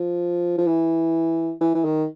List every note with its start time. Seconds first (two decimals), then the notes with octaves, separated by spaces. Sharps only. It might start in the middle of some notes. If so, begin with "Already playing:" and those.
Already playing: F3
0.58 F3
0.67 E3
1.61 E3
1.75 E3
1.85 D#3